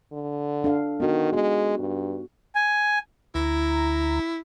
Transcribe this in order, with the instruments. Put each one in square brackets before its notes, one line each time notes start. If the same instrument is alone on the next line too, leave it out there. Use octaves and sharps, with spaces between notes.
[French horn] D3
[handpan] D4 A4 F5
[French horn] D#3 [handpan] B3 D#4 F#4
[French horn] G#3 [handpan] B3 F#4
[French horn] G2
[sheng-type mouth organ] G#5
[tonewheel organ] D2 A#5 [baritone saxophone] E4